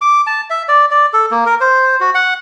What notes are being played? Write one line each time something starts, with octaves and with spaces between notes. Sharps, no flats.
D6
A5
E5
D5
D5
A4
A#3
A#4
C5
F#4
F#5